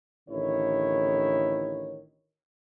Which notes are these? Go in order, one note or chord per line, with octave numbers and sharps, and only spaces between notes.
A1 D3 D#3 E4 C#5